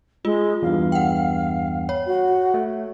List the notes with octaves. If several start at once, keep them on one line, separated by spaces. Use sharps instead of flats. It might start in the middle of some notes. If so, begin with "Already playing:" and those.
G#3 F4
E2 G2 F5
F#5 G5
C#5
F#4
A3